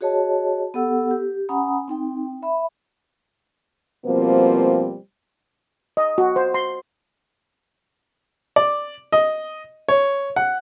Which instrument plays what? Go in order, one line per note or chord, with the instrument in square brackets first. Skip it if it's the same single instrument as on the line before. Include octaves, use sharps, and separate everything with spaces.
[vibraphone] F#4 G#4 C#5 D#5 A5
B3 G4 A4 F#5 E6
G4
C#4 F#5 G#5 A#5 B5 D#6
C4 D#4 G5
E5 B5
[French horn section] B2 F3 G3 A#3 C4
[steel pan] D#5
F#4
C5
C6
[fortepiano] D5
D#5
C#5
F#5